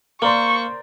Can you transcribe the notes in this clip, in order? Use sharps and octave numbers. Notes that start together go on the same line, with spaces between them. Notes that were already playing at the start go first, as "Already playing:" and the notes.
A#3 A#4 C5 D5 C6 C#6